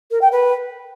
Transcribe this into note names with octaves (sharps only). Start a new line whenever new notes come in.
A#4
G5
B4